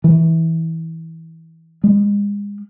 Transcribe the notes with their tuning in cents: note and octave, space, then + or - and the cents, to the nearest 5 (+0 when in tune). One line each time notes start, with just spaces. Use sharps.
E3 -20
G#3 -35